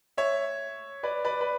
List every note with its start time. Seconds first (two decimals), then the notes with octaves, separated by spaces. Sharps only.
0.17 C#5 E5
1.03 B4 D5
1.25 B4 D5
1.41 B4